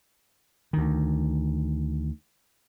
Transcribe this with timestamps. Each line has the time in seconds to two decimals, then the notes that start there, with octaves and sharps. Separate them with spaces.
0.73 D2 D#3